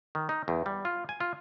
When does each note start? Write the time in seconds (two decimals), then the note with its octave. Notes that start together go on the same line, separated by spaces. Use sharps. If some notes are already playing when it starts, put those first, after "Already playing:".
0.15 D#3
0.29 D#4
0.48 E2
0.66 G3
0.85 F4
1.09 G#5
1.20 F4